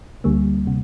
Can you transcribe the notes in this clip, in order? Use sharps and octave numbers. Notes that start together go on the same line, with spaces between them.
D2 D3 G3 A#3
C3